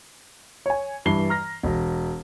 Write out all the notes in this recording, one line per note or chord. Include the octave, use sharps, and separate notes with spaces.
C#5 G#5
G2 E3 C7 G7
A#5 F6 A#6
E1